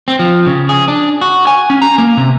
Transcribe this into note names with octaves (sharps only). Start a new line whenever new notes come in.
C4
F3
C#3
G#4
D4
F#4
G#5
C#4
A#5
A#3
C3